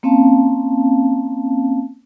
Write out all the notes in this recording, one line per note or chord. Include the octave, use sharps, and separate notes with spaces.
A#3 C4 C#4 F5 A5